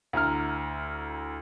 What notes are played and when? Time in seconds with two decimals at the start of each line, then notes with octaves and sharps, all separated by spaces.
0.13 D2 E4 A#5 F6